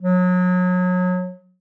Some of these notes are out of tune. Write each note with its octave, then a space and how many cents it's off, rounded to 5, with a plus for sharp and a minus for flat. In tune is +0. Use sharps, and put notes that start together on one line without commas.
F#3 -30